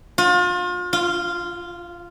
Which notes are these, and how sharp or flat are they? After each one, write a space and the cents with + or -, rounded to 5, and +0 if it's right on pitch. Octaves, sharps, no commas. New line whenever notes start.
F4 +35
F4 -10